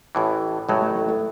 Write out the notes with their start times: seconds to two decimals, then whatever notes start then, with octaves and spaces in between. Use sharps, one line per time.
0.15 A1 A2 E3
0.69 A1 A2 F#3 G#3
0.82 A3
0.96 A3
1.09 A3